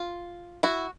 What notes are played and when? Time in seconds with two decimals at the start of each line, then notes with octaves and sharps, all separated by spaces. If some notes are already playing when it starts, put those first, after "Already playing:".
Already playing: F4
0.63 E4 F#4